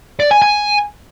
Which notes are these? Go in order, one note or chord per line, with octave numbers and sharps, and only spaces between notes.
D5
G#5
G#5